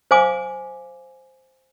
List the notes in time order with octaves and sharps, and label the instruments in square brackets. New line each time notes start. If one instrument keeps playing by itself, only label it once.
[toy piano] C5 F5 G#5 D6